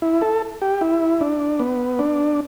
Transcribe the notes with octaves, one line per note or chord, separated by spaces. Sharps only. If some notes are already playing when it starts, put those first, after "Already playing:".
E4
A4
G4
E4
D4
B3
D4